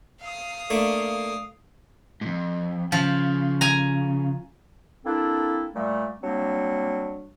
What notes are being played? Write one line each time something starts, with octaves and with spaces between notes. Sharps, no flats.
F5 D#6
A3 A#3 D4
F2 G#2
C#3 F3
G#5 A#5
A#3 C4 D4 E4 A4
A#2 G3 A3
F#3 G3 A#3 C4 D4